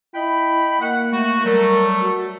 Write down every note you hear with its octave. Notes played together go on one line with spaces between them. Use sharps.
E4 D#5 G5 B5
A#3 F#5
A3 F#4
F#3 G3 A3 A#4
F#4